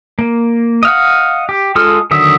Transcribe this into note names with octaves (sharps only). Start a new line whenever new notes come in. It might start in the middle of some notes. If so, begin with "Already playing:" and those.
A#3
D#5 F5 F#5
G4
G#3 F4 A4 D#6 F6
D3 D#3 F#3 E5 D#6